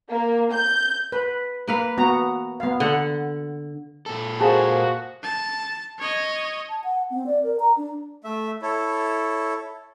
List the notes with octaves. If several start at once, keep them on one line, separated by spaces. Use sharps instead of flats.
A#3
G6
B4
A#3 B4 F5
B3 F#4 A#5
B3 F5
D3 F#5
A#2 A4
A#3 F#4 G#4 C5 F5 A5
A5
C#5 D#5
A5
F#5
C4
D5
A#4
A#5
D4
A3 E5
E4 A4 C#5